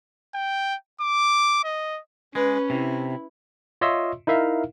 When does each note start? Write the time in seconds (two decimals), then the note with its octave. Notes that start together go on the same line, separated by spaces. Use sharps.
0.35 G5
1.01 D6
1.64 D#5
2.35 G#3 C#4 B4
2.70 C3 E4
3.81 F4 C#5 D#5 E5 C6 E6
4.27 D#4 E4 A#4 E5 F5